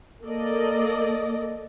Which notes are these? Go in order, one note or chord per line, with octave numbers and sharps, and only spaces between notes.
A#3 A4 D5 D#5